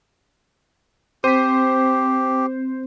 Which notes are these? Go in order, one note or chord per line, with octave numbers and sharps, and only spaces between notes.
C4 G4 C5 B6